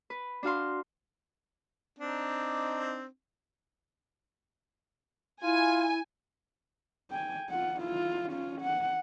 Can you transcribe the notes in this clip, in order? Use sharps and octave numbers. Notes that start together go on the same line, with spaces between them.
B4
D4 F#4 F5 C6
C4 D4 D#4
E4 F4 G#5
G5 G#5
F4 F#5
E4 F4
C#4 F4
F#5